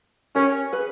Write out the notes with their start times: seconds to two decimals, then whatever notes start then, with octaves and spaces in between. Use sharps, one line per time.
0.35 C#4 G4 A#4
0.72 G#4 B4